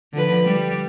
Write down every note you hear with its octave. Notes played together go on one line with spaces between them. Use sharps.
D3 F3 B4
G3